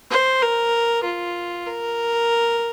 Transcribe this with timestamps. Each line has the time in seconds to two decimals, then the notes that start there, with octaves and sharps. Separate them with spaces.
0.11 C5
0.42 A#4
1.04 F4
1.66 A#4